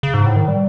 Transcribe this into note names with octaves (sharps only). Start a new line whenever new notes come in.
C#3
G#2
A2
D#3
G3